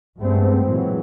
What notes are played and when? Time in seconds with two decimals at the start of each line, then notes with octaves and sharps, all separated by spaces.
0.21 G2 G#3 A3 B3 C4
0.64 A#2 E3 F#3 G#3